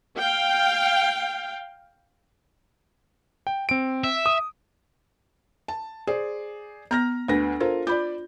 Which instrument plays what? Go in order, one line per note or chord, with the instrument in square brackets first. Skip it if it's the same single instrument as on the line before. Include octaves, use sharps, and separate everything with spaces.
[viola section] F5 G5
[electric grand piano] G5
C4 D7
[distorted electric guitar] E5
[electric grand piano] D#6
[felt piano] A5
G#4 C5 D5
[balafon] B3 [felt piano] A#5 F6 A#6
[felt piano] D2 B4 A#6 [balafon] D4
[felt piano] F4 A4 A#4 [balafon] C5
[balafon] F4 [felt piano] D5 B5 G6